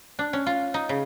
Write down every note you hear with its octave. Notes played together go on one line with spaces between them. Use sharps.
D4
C#4
F4
D#4
C#3